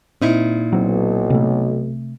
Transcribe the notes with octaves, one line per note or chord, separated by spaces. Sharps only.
A#2 C4 D#4 E4
B1 F#3 C4
C3 A3